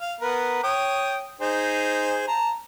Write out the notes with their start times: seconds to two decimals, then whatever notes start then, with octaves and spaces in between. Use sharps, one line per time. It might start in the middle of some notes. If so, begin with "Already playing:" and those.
0.01 F5
0.20 B3 A#4 B4
0.63 C#5 G5 D#6
1.40 D#4 G#4 C5
2.28 A5 A#5